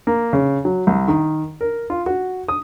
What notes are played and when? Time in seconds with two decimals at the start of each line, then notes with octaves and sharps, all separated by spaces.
0.07 A#3
0.33 C#3
0.65 F#3
0.87 C2
1.08 D#3
1.61 A#4
1.90 F4
2.06 F#4
2.49 D#6